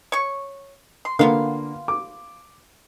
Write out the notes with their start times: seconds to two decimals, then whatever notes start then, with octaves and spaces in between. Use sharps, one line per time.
0.12 C#5 C#6
1.05 C6
1.19 D3 A#3 B3 F4 F5
1.88 D6